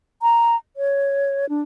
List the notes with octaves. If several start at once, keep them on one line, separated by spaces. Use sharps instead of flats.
A#5
C#5
D4